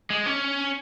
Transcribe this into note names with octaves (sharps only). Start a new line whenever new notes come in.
G#3
C#4